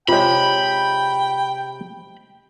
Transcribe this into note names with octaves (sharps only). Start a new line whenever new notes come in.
C3 G#3 F4 C#5 G5 B5